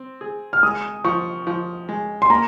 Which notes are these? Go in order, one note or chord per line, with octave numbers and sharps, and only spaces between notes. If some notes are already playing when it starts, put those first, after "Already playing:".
Already playing: C4
G#4
F6
G#3 D#6
F3 C#6
F3
G#3
C6
A#3 A#5